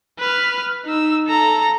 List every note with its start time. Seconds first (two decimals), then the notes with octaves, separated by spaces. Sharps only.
0.19 B4 F6
0.85 D#4 E6
1.28 A4 A#5